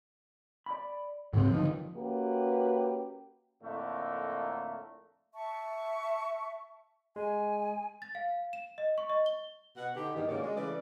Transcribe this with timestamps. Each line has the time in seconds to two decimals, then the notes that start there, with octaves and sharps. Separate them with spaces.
0.66 D5 B5
1.33 D#2 G#2 C#3 C4
1.51 F2 D3 F3 D#4
1.96 A#3 C#4 F#4 G4 B4
3.62 F2 A2 D3 A3 A#3
5.34 E5 A5 C#6
7.16 G#3 G#5
8.02 A6
8.15 F5
8.53 E7
8.78 D#5
8.98 C#6
9.10 D#5
9.26 G7
9.77 B2 F#5
9.95 D3 D#4 G4
10.16 E2 G2 A#2 D#3
10.28 G#2 C#3 A#3 F#4 D5
10.43 G#3
10.57 C#3 E3 A3 B4 D5